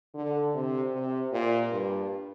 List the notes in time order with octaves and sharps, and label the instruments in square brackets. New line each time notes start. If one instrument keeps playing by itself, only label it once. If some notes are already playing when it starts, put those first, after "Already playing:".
[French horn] D3
C3
C3
A#2
G2